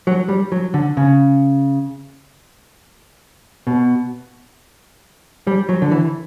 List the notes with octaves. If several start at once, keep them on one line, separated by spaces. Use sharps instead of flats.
F#3
G3
F#3
D3
C#3
B2
G3
F#3
D3
E3